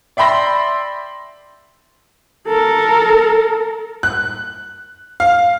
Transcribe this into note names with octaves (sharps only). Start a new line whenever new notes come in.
D5 E5 G5 B5 C6 A#6
A4 A#4
F#6
F5